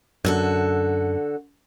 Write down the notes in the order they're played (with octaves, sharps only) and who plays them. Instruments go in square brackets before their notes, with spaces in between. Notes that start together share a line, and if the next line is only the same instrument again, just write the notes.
[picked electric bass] F#2 [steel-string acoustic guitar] D3 F#4 A4